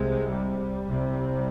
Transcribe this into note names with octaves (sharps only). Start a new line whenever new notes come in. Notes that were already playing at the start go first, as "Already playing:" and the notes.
Already playing: C2 C3 G#3
G3
C2 C3